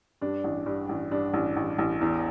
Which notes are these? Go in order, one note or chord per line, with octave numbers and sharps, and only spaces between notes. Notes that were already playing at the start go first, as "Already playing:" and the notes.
G2 D4
A1
G2
A1
G2 D4
A1
A1
A1
E2